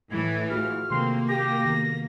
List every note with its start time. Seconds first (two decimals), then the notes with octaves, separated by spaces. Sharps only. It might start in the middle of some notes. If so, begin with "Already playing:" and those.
0.11 A2 E3 G#6
0.50 F4 F#4 G#4 F6
0.91 C3 D#3 A3 A#3 C4 C6
1.28 G4 A#6
1.66 D#3 B3